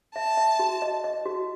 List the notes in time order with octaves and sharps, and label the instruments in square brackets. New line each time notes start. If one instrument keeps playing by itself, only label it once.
[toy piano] E5 [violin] A5
[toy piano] E5
F#4
D#5
D#5
F#4